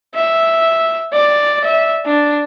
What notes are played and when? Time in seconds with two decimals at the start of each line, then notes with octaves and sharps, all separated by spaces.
0.15 E5
1.13 D5
1.65 E5
2.05 D4